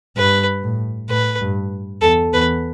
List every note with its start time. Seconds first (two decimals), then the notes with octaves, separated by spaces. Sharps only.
0.16 G2 B4
0.63 A2
1.09 A2 B4
1.41 G2
2.02 E2 A4
2.33 E2 B4